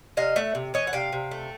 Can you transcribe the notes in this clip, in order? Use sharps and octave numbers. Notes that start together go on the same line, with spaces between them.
C3 D#5 F5
A3 E5 F#5
C3
E3 C#5 D#5
F#5
C3 F5 G5
C3
A3